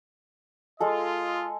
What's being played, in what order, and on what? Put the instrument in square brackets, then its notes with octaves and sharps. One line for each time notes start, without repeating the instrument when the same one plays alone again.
[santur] G#3 G#4 A4 [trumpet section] F4 D#5